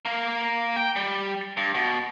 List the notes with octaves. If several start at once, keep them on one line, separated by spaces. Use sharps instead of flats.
A#3 F5
G5
G3
G2
B2